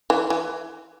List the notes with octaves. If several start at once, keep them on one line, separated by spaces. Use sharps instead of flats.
E3
E3